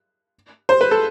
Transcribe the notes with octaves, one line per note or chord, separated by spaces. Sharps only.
C5
B4
A4